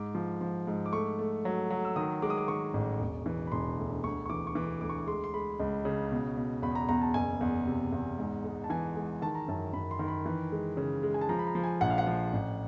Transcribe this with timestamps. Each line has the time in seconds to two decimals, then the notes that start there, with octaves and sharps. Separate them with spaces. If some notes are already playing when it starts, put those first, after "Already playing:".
Already playing: G#2 D6
0.15 F3
0.41 F3
0.67 G#2
0.86 D6
0.93 A3 C#6
1.19 A3
1.45 F#3
1.70 F#3
1.85 E6
1.96 D#3 D#6
2.22 G#3 D6
2.30 D#6
2.38 D6
2.48 D#3 C#6
2.74 A1
3.00 E1
3.26 E3
3.47 B5
3.52 E1 C6
3.78 D2
4.04 D2 C#6
4.26 C#6
4.29 E3 D6
4.47 C#6
4.55 E3 D6
4.81 D2 D6
4.89 C#6
4.98 D6
5.07 G#3 C6
5.24 C6
5.33 G#3 B5
5.60 C#2
5.85 C#3
6.12 B2
6.37 B2
6.62 E2 B5
6.75 A#5
6.89 E2 A#5
7.02 A5
7.14 F#1 G#5
7.41 E2
7.67 C3
7.92 E2
8.18 G#2
8.44 G#3
8.64 A5
8.70 E3 G#5
8.96 G#3
9.22 D#3 A5
9.35 A#5
9.48 F#2 A5
9.73 F#2 B5
9.91 C6
9.99 D#3
10.08 B5
10.26 E3
10.52 G#3
10.77 C#3
11.03 G#3
11.14 G#5
11.21 A5
11.29 F3 A#5
11.39 B5
11.47 A#5
11.55 F3
11.64 G#5
11.81 A#1 F#5
11.90 F5
11.98 F#5
12.07 F3
12.33 A1